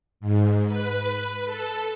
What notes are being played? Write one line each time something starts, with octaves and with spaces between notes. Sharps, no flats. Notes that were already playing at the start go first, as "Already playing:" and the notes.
G#2
B4
A4